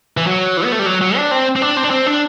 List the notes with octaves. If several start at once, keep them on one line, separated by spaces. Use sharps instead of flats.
E3
F#3
E3
B3
A3
G3
F#3
F#3
D4
C4
C4
D4
C4
D4
C4
D4